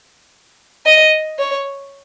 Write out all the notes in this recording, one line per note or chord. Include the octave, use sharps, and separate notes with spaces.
D#5
C#5